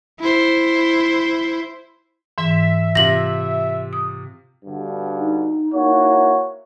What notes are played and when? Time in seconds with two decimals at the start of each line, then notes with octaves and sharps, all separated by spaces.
0.20 E4 C5
2.38 G#2 E3 E5
2.95 C3 F4 A#6 F#7
3.93 D#6
4.65 G2 B2 D3
5.18 D#4
5.73 A#3 E4 F#4 C#5